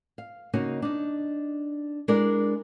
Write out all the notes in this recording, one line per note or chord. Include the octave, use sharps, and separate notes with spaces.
F5
C#3 A#3 C#4 D#4 F#4
D4 D#4
G#3 D4 E4 A#4 D5